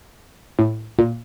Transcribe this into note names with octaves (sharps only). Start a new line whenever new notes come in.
A2
A#2